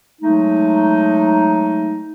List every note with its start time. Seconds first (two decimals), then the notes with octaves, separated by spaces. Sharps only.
0.21 F#3 G#3 A3 D#4